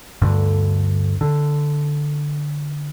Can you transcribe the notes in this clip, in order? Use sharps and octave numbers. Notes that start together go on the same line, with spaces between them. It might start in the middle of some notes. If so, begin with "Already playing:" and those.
D2 G2 D3
D3